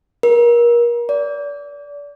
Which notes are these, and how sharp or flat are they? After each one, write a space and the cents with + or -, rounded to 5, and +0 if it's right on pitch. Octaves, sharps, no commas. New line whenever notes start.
A#4 +30
D5 -30